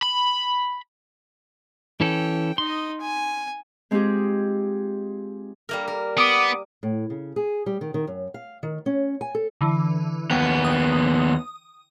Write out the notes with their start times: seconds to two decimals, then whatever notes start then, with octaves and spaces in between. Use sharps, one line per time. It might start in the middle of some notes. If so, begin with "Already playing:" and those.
0.03 B5
2.01 E3 C#4 A4 G5
2.58 D#4 D#5 C6
3.01 G#5
3.91 G#3 C4 D#4 F4 G4 G#4
5.69 G3 A#3 A#4
5.88 A#4
6.18 B3 D6 D#6
6.83 A2
7.10 C#3
7.36 G#4
7.66 G3
7.81 D#3
7.94 D#3
8.07 F#2
8.34 F5
8.63 D#3
8.86 C#4
9.21 G#5
9.35 A4
9.61 D3 E3
10.31 D#2 B3 G5
10.64 D#6